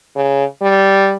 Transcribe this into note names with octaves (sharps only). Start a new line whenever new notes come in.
C#3
G3